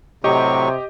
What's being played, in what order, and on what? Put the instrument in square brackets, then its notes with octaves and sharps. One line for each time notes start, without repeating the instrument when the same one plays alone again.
[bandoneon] A2 F#3 C#6 [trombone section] C3 [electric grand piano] G4 D#5